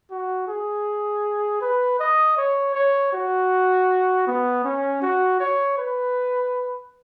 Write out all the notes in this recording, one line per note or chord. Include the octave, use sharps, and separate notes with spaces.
F#4
G#4
B4
D#5
C#5
C#5
F#4
B3
C#4
F#4
C#5
B4